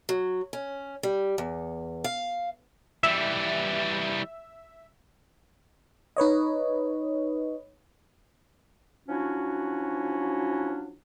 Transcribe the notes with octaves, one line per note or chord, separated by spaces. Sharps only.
F#3
C#4
G3
E2
F5
E3 G3 E5
D#4 B4 C#5 D#5
F3 F#3 C#4 D4 E4 F#4